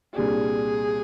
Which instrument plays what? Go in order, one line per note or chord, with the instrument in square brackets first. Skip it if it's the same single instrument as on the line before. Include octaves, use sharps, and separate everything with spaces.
[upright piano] C2 A#2 G3 D4 G4 [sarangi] G#4